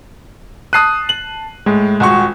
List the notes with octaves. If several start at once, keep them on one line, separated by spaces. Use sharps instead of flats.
A5 D#6 F#6 C7 D#7
F#7
A2 G#3
D#1 F#4 C#6